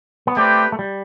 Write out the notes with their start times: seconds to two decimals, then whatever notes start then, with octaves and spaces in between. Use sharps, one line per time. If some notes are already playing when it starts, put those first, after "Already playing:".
0.27 B3
0.37 A3 C4 G4 B4 D5 G5
0.72 A3
0.79 G3